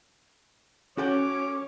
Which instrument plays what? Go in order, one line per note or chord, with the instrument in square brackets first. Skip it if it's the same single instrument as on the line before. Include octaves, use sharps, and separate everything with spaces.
[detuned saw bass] C#4 [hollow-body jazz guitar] F#4 A4 G5 [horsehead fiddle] C#5 [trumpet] D6